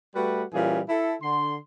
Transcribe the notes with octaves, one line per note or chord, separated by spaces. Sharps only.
G3 A3 F#4 B4
A#2 E3 G3 C#4 G#4
E4 A4
D3 C6